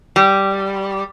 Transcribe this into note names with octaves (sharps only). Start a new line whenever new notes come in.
G3